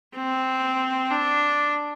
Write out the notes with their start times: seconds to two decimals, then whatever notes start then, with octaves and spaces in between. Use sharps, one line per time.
0.16 C4
1.11 D4